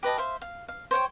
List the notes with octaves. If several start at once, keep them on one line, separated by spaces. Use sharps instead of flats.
G4 B4 D#5 A5
C5 E5 F5
F5
F5
C5 C#5 F#5 G5